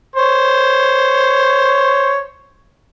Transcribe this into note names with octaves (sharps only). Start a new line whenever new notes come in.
C5 C#5